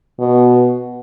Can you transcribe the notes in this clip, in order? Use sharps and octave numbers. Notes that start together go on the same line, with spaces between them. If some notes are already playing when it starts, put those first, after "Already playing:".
B2